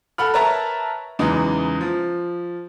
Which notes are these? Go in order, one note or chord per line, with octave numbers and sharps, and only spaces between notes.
A4 F#5 B5 F6
A#4 B4 C#5 E5 A5 A#5
E2 C#3 E3 F#3 G#3 D#4
F3